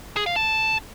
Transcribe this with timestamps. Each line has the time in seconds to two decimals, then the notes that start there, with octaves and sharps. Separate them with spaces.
0.16 G#4
0.26 F5
0.36 A5